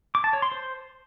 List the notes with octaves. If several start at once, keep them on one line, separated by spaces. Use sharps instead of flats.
D6
A5
C#5
C6
C5